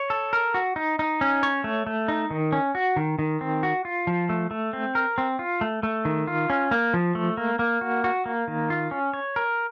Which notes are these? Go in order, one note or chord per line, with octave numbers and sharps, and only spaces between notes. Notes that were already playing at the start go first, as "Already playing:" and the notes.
Already playing: C#5
A4
A#4
F#4
D#4
D#4
C#4
C#5
A3
A3
D#4
D#3
C#4
F#4
D#3
D#3
C4
F#4
F4
F3
A3
A3
C4
A#4
C4
F4
A3
A3
D#3
F4
C#4
A#3
F3
A3
A#3
A#3
F#4
F#4
A#3
D#3
F4
C#4
C#5
A#4